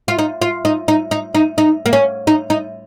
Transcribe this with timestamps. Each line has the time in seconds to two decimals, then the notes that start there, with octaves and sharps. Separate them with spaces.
0.08 F4
0.19 D#4
0.42 F4
0.65 D#4
0.88 D#4
1.11 D#4
1.35 D#4
1.58 D#4
1.86 A#3
1.93 C#4
2.27 D#4
2.50 D#4